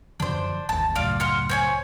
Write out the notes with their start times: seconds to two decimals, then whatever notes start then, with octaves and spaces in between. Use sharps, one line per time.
0.20 F#2 D3 F3 D4 C5
0.69 G1 D#2 A5
0.95 C#2 F#2 A2 F4 D5 F5
1.20 F#5 C6 F6
1.49 C5 C#5 G#5